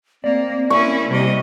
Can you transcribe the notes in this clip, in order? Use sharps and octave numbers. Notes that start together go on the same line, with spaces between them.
A#3 C4 D5
A#3 C#4 E4 G#4 C#6
C3 G3 D#5